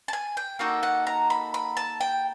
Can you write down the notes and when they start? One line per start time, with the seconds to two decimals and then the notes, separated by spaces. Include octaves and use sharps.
0.08 A5
0.13 G#5
0.37 G5
0.59 A#3 D#4 F#4 A4 G5
0.83 F#5
1.07 A#5
1.30 B5
1.54 B5
1.77 A5
2.01 G5